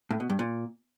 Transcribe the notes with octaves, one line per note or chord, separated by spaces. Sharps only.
A2
B2
G2
A#2